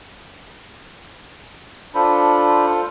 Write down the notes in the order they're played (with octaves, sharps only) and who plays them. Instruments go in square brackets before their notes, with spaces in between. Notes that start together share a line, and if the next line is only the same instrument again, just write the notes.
[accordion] D4 B5 [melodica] F4 A4 C5